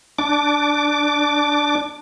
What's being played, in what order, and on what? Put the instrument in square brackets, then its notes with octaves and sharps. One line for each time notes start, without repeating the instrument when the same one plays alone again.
[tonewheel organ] D4 D6